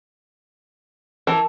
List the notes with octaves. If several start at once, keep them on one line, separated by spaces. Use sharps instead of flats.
E3 A#4 A5